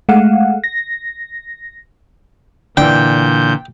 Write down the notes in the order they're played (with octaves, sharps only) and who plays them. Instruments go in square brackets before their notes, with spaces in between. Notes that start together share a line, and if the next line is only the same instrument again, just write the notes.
[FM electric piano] G#3 A3 F5 F#5
A#6
[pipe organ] A#2 G6 [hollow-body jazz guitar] D3 E3 [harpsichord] G5